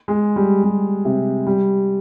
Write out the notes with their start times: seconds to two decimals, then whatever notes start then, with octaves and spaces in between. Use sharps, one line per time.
0.08 G#3
0.36 G3
0.63 G3
1.05 C3
1.47 G3